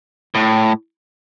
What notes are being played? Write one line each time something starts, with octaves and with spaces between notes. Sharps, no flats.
A2